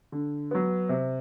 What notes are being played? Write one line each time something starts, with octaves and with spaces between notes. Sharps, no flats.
D3
F#3 B3
C3